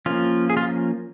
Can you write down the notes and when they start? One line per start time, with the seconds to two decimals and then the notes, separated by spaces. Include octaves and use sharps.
0.06 F3 A#3 C#4 F4
0.50 G#4
0.57 F4